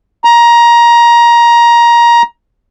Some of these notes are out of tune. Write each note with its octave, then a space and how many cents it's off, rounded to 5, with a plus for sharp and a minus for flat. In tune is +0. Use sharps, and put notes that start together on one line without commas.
A#5 +20